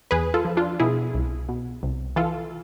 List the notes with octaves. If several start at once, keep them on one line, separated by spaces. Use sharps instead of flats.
E2 G#4 B4
F4 A4
F3
D4 F4
B2 E4 G#4
C2
B2
C2
E3 F4 A4